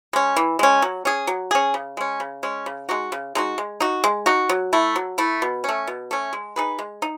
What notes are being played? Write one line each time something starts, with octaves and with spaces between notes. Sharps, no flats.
G#3 C#4
E3
G#3 C#4
F#3
C#4 G#4
F#3
C#4 G#4
C#3
G#3 C#4
C#3
G#3 C#4
C#3
G#3 D#4 F#4
C#3
G#3 D#4 F#4
G#3
D#4 F#4
G#3
D#4 F#4
F#3
A3 E4
F#3
A3 E4
B2
A3 C#4
B2
A3 C#4
G#3
D#4 G#4 B4
G#3
D#4